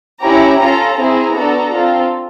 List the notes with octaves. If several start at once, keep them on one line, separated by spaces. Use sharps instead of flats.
C#4 E4 G4 A#5
C#4 F4 A4 A#5
C4 E4 G#4 A#5
B3 D4 F#4 A4
C4 F4 A4